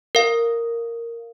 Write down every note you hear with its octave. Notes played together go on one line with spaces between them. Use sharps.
A#4 F5